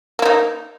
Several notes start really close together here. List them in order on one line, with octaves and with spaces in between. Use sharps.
A#3 E4 D#4